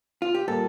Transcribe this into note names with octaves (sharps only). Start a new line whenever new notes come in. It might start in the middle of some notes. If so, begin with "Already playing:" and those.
F4
G4
A#2 G3 A#3 A4